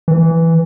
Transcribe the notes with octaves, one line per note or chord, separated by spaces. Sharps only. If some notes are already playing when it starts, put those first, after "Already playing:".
E3